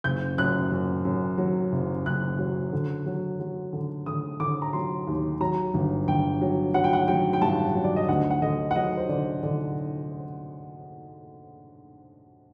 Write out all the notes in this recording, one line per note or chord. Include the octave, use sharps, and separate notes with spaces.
F#1 G6
F#2 F#6
F#2
F#2
F#3
F#1
F#1 F#6
F#3
D3
F#3
F#3
D3
D3 D#6
D3 D6
A#5
F#3 C6
D#2
F#3 A#5
G1
G1 G5
F#3
F#3 F#5
G5
F#5
F#3 G5
G5
G2 A5
F#3
D5
D#5
D2 F#5
F#5
D3 D#5
F#5
F#3 D#5
C5
D3 D5
D3 D5